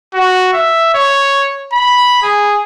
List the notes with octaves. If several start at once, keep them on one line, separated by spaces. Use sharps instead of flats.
F#4
E5
C#5
B5
G#4